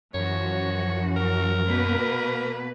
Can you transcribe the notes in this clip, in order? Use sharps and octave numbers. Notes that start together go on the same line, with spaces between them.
F#2 E3 F3 F#4 C#5
A#4
B2 A#3 B4